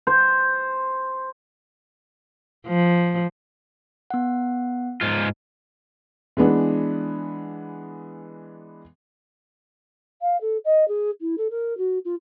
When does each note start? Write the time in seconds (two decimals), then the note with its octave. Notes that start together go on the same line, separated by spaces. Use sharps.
0.07 C5
2.67 F3
4.10 B3 F#5
5.01 G#2 F4
6.37 E3 G#3 B3 D4
10.22 F5
10.41 A4
10.65 D#5
10.88 G#4
11.21 E4
11.38 A4
11.50 A#4
11.77 F#4
12.05 F4